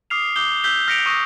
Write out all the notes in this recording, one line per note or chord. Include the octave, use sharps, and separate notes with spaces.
D6 D#6 F6 C7 F7
D6 D#6 G6 G7
E6 G6 B6 G7
F6 A#6 B6 C#7 D7 F7
C#6 D#6 F6 A#6